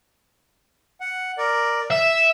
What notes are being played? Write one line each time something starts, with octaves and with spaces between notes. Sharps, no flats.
F#5
A#4 D5
E5 E6